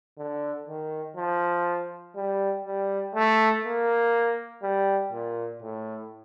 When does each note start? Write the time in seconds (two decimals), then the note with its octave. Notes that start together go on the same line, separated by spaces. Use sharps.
0.18 D3
0.68 D#3
1.17 F3
2.16 G3
2.66 G3
3.15 A3
3.65 A#3
4.63 G3
5.12 A#2
5.62 A2